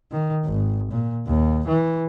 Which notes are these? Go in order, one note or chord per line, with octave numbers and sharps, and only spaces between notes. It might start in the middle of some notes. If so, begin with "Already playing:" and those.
D#3
G#1
A#2
D#2
E3